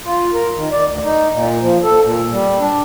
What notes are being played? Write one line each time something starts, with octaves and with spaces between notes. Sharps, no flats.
F4
A#4
D#3
D5
D2
D#4
A#2
F3
A4
A#2
G3
D4